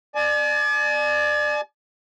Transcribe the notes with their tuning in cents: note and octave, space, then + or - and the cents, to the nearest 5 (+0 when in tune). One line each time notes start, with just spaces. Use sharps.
D5 +25 G#5 +45